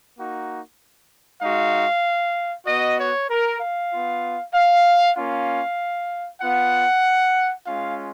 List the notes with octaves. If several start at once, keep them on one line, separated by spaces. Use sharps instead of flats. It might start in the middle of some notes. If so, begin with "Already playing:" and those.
A#3 D#4 F#4
G#3 D#4 F#4 F5
B3 F#4 D#5
C#5
A#4
F5
B3 F4
F5
A#3 C#4 F4 F5
B3 F4 F#5
G#3 C#4 F4 F5